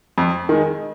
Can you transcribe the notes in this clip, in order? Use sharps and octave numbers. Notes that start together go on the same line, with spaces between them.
F2
D#3 G#3